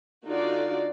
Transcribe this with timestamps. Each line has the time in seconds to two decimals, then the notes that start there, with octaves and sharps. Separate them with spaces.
0.24 D3 D#4 F4 F#4 D5